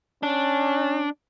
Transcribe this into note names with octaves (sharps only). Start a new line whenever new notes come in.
C#4 D4